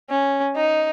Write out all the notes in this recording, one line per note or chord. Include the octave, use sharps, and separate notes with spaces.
C#4
D#4